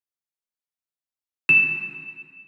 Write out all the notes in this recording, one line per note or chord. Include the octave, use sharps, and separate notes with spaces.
E7